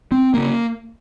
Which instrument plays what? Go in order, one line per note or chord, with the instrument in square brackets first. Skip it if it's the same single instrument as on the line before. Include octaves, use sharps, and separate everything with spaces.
[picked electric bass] C4
C#3 A#3